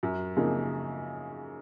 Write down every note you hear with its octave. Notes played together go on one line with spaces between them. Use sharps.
F#2
C#3 F3 A#3 D#4